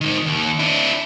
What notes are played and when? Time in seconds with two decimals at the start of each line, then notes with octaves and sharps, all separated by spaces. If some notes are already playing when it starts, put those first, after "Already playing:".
0.01 G#2 D#3
0.26 D#2
0.59 D4 E4